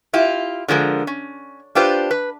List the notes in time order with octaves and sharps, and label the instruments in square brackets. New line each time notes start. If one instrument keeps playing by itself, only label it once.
[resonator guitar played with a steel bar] E4 F4 G4
D3 F3 G#3 A#4
C#4
D4 F4 G4 B4 C5
B4